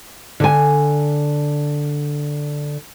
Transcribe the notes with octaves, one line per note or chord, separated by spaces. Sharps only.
D3 G#5